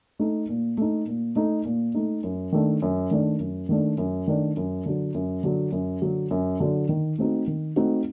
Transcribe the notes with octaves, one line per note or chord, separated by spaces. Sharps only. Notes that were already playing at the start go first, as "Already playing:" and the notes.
A3 D#4
A#2
A3 D#4
A#2
A3 D#4
A#2
A3 D#4
F#2
D#3 A3 D4
F#2
D#3 A3 D4
F#2
D#3 A3 D4
F#2
D#3 A3 D4
F#2
D3 F#3
F#2
D3 F#3
F#2
D3 F#3
F#2
D3 F#3
D#3
A3 C4 D#4 F#4
D#3
A3 C4 D#4 F#4